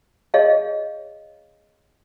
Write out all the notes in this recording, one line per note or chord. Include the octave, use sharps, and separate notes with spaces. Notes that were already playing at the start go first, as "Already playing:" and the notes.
G#4 C#5 D#5 F5